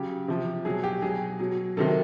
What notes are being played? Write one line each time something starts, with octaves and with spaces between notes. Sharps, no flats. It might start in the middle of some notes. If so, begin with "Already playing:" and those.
Already playing: C#3 F#3 G4
C3 F3
B2 F#3 G#4
G4
B2 F#3 G#4
B2 F#3
C3 D#3 F#3 A4